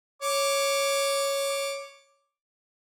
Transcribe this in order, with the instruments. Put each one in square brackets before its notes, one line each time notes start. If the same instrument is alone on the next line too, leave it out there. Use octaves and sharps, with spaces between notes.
[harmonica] C#5 D6